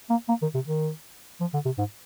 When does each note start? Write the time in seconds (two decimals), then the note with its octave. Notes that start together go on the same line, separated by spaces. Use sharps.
0.10 A#3
0.29 A#3
0.42 D#3
0.54 C3
0.67 D#3
1.41 F3
1.54 D3
1.65 C3
1.78 G#2